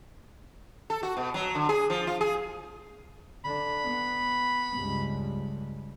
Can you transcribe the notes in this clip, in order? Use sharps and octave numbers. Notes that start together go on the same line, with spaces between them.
A4
F#4
B2
F#3
D3
G#4
F3
F4
G#4
D3 D4 B5
B3
C#2 G2